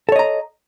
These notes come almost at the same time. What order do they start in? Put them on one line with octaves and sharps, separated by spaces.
A4 C#5 D#5 A#5